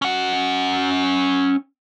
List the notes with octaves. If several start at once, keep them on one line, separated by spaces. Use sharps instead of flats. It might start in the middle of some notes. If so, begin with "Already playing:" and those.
C#4 F#5